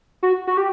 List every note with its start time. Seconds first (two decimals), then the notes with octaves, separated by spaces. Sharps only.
0.23 F#4
0.47 F#4
0.57 G4